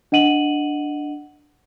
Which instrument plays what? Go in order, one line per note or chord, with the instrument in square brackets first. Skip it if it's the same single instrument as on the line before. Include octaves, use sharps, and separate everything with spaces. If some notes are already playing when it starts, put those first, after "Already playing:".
[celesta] D4 D#5 F#5 D#7 F#7